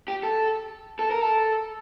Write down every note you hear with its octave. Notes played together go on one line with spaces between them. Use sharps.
G4
A4
A4
A#4
A4